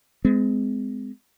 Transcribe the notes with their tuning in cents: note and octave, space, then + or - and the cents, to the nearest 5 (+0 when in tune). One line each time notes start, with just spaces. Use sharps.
G#3 +0 C4 -45